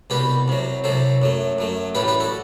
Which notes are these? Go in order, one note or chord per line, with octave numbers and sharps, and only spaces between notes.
C2 B2 G3 G4 B4
C2 C3 F#3
C2 C3 F#3 A4 C5
F#2 F#3 A3
F#2 F#3 A3
A1 A2 E3 G3 G4 B4
G4 B4
F#4 A4